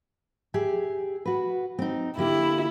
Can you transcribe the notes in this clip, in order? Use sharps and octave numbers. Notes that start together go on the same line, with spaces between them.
G4 G#4 E5
F#4 B4
C4 D#4
D3 A#3 E4 G4